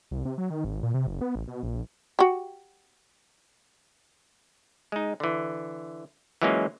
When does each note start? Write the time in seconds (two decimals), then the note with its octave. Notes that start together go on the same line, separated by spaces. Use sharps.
0.11 C2
0.25 C3
0.38 F#3
0.50 D#3
0.64 G#1
0.83 A#2
0.94 C3
1.07 F#1
1.21 B3
1.35 A1
1.48 B2
1.63 A#1
2.19 F#4 G4
4.92 G#3 D#4
5.20 D3 E3
6.42 E3 F#3 G#3 A#3 C#4 F4